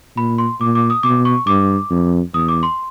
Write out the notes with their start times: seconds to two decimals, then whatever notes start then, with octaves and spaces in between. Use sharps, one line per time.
0.16 A#2 B5
0.38 C6
0.61 A#2 D6
0.75 D6
0.90 D#6
1.03 B2 D6
1.25 C#6
1.46 G2 D6
1.90 F2
2.33 E2 D#6
2.49 D6
2.63 C6